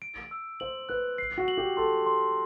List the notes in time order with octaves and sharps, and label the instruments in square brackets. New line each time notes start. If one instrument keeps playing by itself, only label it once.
[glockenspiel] D7
E6
[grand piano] C5 [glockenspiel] F#7
[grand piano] B4 [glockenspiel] F#6
[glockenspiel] C7
[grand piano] F#4
[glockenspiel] F#7
[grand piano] G4
[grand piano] A4 [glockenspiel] C6
[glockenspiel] C6